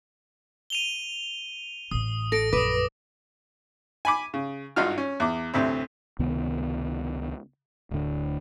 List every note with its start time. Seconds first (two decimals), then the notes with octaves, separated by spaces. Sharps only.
0.70 D#7 F7 G7
1.91 A1 A2 D#6
2.32 A4 A#6 D7
2.53 A#1 F#2 B4 D6 D#6
4.05 G#5 B5 D6
4.34 C#3
4.76 G#1 G2 D#4 F4 F#4 F6
4.98 C#4
5.20 E2 D6
5.54 D2 A2 C3 C4
6.19 C#2 C3 D#3 B3
7.91 D1 D2 A2 D3